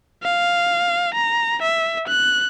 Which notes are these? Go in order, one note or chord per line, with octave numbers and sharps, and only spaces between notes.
F5
A#5
E5
F#6